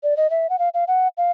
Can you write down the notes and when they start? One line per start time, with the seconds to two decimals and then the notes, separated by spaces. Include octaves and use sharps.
0.03 D5
0.17 D#5
0.30 E5
0.50 F#5
0.59 F5
0.74 F5
0.88 F#5
1.18 F5